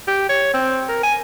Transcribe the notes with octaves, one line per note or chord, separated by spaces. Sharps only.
G4
C#5
C4
A#4
G#5